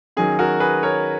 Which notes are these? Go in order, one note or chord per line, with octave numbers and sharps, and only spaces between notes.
D#3 F#3 C#4 G#4
F#4 A#4
G#4 B4
A#4 C#5